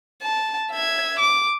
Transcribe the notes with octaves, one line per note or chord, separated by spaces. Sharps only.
A5
E5 G#6
D6